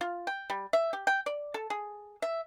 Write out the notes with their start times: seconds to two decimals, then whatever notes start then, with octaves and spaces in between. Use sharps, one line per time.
0.01 F4
0.27 G5
0.50 G3
0.73 E5
0.93 G4
1.07 G5
1.26 D5
1.54 A4
1.70 G#4
2.22 E5